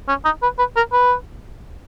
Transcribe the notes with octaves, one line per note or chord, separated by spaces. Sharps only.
C#4
D#4
B4
B4
A#4
B4